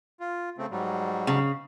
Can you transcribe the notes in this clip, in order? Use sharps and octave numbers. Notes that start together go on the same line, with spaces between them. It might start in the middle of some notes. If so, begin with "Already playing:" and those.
F4
C#3 A3 C4
G#2 F#3 G3
C#3